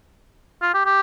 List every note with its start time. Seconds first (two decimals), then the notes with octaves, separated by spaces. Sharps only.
0.62 F4
0.74 G4
0.85 G4